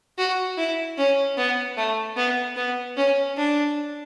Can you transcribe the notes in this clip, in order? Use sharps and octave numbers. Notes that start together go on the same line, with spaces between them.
F#4
E4
C#4
B3
A3
B3
B3
C#4
D4